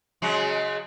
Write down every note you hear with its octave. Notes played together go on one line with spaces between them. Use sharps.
C#3 F#3 G#3